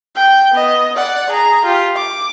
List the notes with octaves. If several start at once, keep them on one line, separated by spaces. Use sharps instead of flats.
G5
B3 D#5
D5 F#5
G#4 A#5
F4 G4
D6